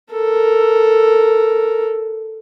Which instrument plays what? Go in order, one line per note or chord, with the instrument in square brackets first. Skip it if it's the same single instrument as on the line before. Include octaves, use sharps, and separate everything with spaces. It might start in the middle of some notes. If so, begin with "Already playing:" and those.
[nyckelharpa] A4 A#4